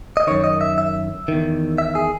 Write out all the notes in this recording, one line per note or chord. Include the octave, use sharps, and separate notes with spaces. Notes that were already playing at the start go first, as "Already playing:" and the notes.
D#5
F#2 D#3 C#5
D#5
E5
E5
E2 D#3
E5
G#4